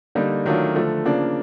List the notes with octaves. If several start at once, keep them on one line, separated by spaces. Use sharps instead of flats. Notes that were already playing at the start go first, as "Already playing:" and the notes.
D3 G3 A#3 D#4
D#3 F#3 A3 D4 F4
D3 F3 A3
C#3 F3 A#3 D4